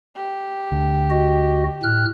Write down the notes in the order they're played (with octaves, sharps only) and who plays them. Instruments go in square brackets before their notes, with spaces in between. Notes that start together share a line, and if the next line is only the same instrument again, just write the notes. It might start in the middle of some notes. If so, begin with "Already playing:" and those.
[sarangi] G4
[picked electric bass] D2 D3
[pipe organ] F#4 D#5
A2 F6 F#6